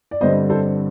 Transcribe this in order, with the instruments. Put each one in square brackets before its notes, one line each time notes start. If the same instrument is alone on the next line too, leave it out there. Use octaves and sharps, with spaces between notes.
[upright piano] D5
G2 D3 G3 C4 C5 D#5
A4 C5